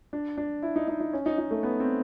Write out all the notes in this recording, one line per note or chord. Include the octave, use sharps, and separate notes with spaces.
D4
D4
E4
D#4
D#4
D#4
C#4
D#4
D#4
A3
B3
C4